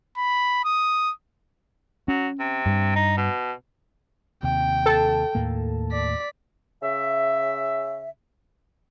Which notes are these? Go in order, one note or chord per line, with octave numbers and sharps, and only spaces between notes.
B5
D#6
F#3 C#4
C3
G2
D#4
B2
D#2 C3 G5
A4 A5
D#2 A2 A#3
D5 B6
C#3 E5